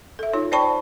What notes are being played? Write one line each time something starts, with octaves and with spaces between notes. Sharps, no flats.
A4 E5
D#4 F4 C#5
C5 D5 G5 A5 B5 C#6